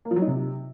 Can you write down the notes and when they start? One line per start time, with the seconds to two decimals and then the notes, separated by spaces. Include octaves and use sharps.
0.05 A#3
0.11 F3
0.16 F#3
0.22 D#4
0.27 C3